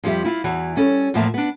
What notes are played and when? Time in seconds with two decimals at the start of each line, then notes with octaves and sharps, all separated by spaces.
0.04 F2 F3 G3 G4 E5
0.25 E4 F4 F5
0.44 E2 E3 F#4
0.75 G3 C#4 A4
1.14 E2 A2 F3 A#3 E5 A5
1.34 B3 D4